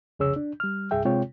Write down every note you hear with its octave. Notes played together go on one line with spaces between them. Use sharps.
C2 F2 C#3 G#4 C#5 E6
D4
G3 F6
C2 G2 G#4 E5 G5
C3 G#3 C4 F4 C#5 G5